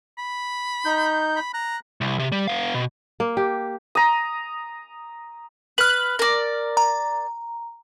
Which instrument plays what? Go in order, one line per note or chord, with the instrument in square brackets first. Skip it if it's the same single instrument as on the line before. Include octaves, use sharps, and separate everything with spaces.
[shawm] B5
[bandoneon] D#4 G6
[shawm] B5
[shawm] A#5 [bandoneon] F#6
[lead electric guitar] C2
C3
G3
B3 F5
B2
[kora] A#3
G4
[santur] A#5 D#6
[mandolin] B4 [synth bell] F6 F#7
[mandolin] A#4 D5
[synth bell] A#5